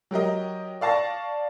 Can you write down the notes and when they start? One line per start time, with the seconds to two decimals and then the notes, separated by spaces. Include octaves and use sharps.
0.11 F#3 G4 A#4 D#5
0.81 D5 F5 A5 C#6 A#6